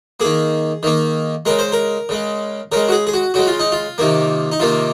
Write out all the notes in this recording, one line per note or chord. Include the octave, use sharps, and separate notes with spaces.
D#3 A#3 G#4
D#3 A#3
C#3 G#3 A#4
C5
A#4
C#3 G#3
C#3 G#3 A#4
F#4
G#4
G#4
F#4
C#3 G#3 F#4
F4
D#4
F4
C3 D#3 A#3
D#4
C3 D#3 A#3 F4